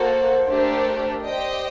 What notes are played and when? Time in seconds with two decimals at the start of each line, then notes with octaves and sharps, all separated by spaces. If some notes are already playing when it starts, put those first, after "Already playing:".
Already playing: A#3 F#4 A4 C5
0.47 A3 D4 G4 A#4
1.24 G4 C5 D5 D#5 G5